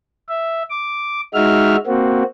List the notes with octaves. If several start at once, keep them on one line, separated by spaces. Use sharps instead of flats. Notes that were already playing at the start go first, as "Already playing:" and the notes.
E5
D6
G#3 D#4 F#4 E5 F6
A#3 C4 F#4